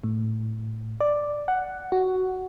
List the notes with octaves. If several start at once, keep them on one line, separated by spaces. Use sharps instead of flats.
A2
D5
F#5
F#4